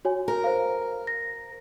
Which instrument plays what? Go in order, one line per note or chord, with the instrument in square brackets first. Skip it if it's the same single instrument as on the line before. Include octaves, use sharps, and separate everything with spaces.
[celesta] F#4 C#5 G#5
[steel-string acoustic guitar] A#4
[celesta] C5 F5
A#6